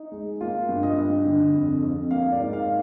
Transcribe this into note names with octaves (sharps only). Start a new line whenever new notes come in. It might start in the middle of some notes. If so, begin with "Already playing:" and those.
Already playing: D#4
G#3
A#3 F4
G2
D#5
G2
D3
F2
F2
A#3 F5
D5
G#2
F5